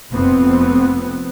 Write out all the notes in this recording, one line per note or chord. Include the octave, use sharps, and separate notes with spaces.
F1 F2 B3 C4